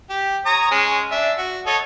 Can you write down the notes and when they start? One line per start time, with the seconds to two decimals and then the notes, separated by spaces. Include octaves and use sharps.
0.10 G4
0.46 C#5 A#5 D#6
0.71 G#3 C#4
1.11 D4 E5
1.38 F#4
1.66 A4 C#5 D#5